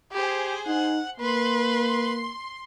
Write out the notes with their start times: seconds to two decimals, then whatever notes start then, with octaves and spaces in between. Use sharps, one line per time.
0.12 G4 G#4 C5
0.67 D#4 F#5
1.20 A#3 B4 C6